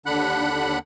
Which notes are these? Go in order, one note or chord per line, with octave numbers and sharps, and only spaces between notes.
D#2 D3 D4 F#5 B5 F#6